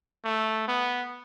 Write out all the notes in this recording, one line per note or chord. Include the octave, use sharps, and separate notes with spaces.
A3
B3